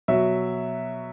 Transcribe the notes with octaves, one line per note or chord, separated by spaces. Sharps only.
B2 F#3 E5